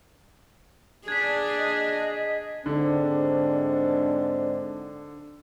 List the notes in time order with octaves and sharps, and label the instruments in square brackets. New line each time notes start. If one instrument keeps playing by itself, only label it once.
[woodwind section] D4 [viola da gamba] G#4 [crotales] G#6 B6
[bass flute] D#5
[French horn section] G#2 C4 D4 [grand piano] D3